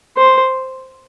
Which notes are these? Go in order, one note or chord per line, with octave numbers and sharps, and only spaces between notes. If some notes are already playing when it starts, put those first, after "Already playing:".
C5